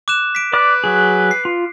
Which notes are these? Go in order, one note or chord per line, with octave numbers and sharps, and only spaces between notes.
D6 F#6 E7
B6 D7
B4 D5 D6
F#3 G#4
C7
F4